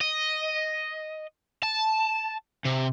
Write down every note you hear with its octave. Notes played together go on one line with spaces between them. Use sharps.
D#5
A5
C3